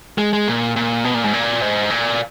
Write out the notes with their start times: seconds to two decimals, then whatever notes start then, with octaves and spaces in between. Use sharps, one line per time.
0.18 G#3
0.33 G#3
0.48 A#2
0.76 A#2
1.04 B2
1.14 A#2
1.24 G#2
1.33 A#2
1.61 G#2
1.90 A#2